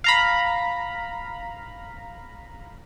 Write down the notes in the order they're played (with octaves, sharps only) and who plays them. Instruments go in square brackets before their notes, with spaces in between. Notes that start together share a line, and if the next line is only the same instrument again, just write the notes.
[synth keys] F5 A#5 B5